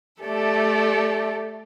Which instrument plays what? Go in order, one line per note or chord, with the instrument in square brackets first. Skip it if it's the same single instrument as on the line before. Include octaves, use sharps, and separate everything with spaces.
[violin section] A3 A4 [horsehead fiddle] G4 D5